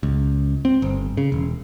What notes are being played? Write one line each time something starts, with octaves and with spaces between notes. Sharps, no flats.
C#2
C4
G1
C#3
E1